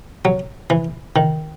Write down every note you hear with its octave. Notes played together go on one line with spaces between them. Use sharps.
F#3
E3
D#3